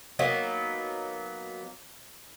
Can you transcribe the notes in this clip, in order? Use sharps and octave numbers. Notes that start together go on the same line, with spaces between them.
F#3 A#3 B3 D#4